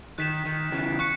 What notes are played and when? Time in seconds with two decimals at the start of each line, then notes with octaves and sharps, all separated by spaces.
0.18 D#3 F#6 B6 E7
0.45 D#3
0.72 C#3 E3
0.99 C#6 F#6 C#7